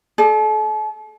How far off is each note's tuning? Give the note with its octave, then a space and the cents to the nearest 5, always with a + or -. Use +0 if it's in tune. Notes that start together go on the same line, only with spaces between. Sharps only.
A4 -40 D5 +35